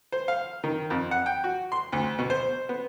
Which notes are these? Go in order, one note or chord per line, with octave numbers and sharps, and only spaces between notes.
C5
F5
D#3
F2
F#5
G5
F#4
C6
D2
B2
C5
B3